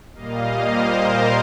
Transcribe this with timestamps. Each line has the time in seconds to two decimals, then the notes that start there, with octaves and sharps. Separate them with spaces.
0.14 A#2 G3 A#3 D#5 F5
0.68 A#4 C5